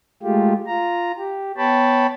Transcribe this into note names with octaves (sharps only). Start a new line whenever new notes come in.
G#3 A3 F4 G4
F4 A#5
G4
B3 C#5 G5 A5 B5